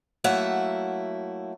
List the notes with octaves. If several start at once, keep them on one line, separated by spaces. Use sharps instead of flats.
F#3 A3 A#3 E4 E5 F#5